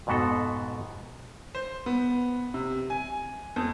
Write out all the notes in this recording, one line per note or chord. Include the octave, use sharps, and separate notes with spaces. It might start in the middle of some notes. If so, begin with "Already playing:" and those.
F2 G#2 B2 B3 F#4 A4
C5
B3
C3
G#5
F2